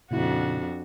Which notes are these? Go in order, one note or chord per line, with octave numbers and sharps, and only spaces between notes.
F2 A#2 C#3 D4 E4 F#4